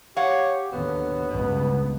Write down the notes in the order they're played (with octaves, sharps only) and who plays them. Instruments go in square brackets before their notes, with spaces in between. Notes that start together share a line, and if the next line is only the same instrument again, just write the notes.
[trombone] G4 [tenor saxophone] C#5 [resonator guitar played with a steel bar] F5 F#5
[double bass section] D#2 D3 [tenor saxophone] F#3 [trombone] B3
[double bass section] C#2 G2 [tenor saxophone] B2